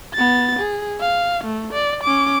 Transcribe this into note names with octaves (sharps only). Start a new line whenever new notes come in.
B3 A6
G#4
F5
A3
D5
C#4 D6